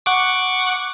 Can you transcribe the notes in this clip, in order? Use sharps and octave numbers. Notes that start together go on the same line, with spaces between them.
F#5 C#6 D6